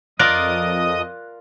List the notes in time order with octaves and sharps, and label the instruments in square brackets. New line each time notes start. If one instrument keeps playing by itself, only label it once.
[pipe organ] F2 D#5 D#6 [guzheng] F4 A#4 D5 [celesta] F#6